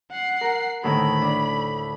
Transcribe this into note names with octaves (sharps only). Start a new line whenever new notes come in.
F#5 C7
A#4
D2 A2 D#3 B5
D4